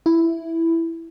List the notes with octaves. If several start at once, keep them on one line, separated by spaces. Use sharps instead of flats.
E4